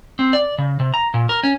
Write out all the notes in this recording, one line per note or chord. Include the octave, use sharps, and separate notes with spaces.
C4
D5
C#3
C3
A#5
A#2
A#4
C#4